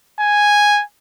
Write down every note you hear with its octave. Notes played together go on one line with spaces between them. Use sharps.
G#5